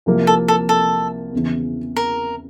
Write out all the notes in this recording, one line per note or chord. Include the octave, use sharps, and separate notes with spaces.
C2 C3 F3 A#3
A4
A4
A4
E2 C#3 E3
A#4